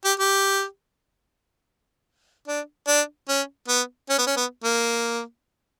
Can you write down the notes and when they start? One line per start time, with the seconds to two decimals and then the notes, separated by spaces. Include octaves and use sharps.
0.05 G4
0.20 G4
2.48 D4
2.88 D4
3.29 C#4
3.68 B3
4.10 C#4
4.18 B3
4.27 C#4
4.37 B3
4.64 A#3